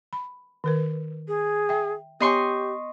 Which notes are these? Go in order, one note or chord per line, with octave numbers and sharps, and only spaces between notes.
B5
D#3 A#4 B4
G#4
E5 G5
B3 G4 C#5 D#5 G#5 C6 C#6